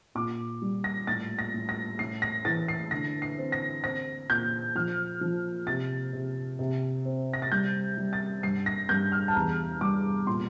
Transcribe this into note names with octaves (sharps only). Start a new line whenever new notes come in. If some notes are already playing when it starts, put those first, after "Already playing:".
A#2 D6
G3
A#6
A2 A6
A#6
A2
A#6
A2 C7
A#6
E3 A6
C7
D3 A#6
C7
C4
A#6
C4 A#6
A#2 G6
F3 F6
F3
C3 A6
C3
C3
C4
A#6
A6
G3 G6
G3
A6
G2 C7
A#6
G2 G6
F6
A5
E2 A#5
G3 D6
A#2 C6